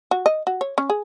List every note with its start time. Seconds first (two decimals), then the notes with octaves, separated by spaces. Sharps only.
0.11 F#4
0.26 D#5
0.47 F#4
0.61 C#5
0.78 C#4
0.90 G#4